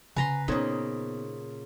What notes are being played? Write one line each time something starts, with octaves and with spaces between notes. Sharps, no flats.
C#3 B4 G#5 A#5 C6
A#2 C#3 B3 D#4 C5 C#5